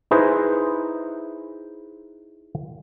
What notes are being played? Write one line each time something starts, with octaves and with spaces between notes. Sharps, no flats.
D#4 E4 G#4 B4 C5 D#5